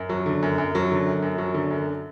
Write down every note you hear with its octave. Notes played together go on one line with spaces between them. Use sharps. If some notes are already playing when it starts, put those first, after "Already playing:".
Already playing: F#2
F#3
D3
F#2
F#2
F#3
D3
F#2
F#2
F#3
D3
F#2